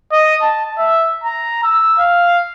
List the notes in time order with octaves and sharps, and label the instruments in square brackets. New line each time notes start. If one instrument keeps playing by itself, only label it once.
[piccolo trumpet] D#5
A5
E5
A#5
E6
F5